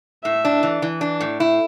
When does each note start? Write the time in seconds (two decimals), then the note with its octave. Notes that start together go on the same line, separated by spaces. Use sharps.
0.25 A2 E5
0.45 D4
0.63 E3
0.82 E3
1.01 D4
1.20 A2
1.40 E4